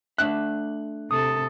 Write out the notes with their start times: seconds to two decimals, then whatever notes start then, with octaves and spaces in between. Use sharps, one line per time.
0.18 A3 D4 E5 F#6
1.11 C3 A4 D#6